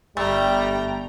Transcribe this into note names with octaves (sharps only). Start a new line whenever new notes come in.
G1 G3 A3 G5 A#5